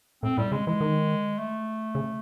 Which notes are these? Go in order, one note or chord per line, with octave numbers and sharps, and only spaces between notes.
A2 C4
A2 G3
C#3 G#3
E3 G#3
D#3
A3
C#3